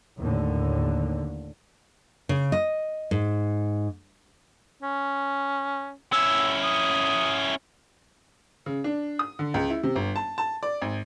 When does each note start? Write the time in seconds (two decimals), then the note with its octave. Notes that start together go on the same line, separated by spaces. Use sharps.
0.19 D#2 A2 D3
2.29 C#3
2.52 D#5
3.11 G#2
4.83 C#4
6.13 C#4 E4 E6
6.64 D#6
8.66 C#3
8.84 D4
9.19 D#6
9.39 D3
9.54 C#2
9.70 E4
9.83 C3
9.96 G1
10.16 A5
10.38 A5
10.63 D5
10.82 G#1